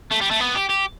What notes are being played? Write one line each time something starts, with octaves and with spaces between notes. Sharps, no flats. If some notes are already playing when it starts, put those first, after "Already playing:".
A3
G3
A3
B3
G4
G4